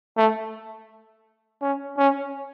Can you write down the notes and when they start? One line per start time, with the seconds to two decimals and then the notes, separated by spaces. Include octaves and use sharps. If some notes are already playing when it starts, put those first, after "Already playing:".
0.17 A3
1.61 C#4
1.98 C#4